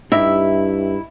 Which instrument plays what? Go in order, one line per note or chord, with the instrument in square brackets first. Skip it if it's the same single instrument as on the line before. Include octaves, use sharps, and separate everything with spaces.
[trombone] G2 [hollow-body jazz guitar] D#4 E4 G4 [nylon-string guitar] E5